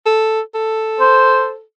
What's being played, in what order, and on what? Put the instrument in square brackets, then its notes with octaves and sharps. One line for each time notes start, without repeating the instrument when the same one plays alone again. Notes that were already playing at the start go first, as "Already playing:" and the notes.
[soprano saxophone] A4
A4
[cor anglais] C5